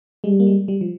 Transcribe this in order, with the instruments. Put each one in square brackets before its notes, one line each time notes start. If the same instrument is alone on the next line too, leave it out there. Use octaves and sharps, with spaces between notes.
[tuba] G3 [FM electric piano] G#3
[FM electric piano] A#3
G#3
G3
F3